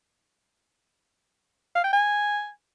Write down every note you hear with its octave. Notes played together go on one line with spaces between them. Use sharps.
F5
G5
G#5